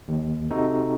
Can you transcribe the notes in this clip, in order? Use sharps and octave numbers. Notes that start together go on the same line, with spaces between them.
D#2
C3 D#4 F#4 A4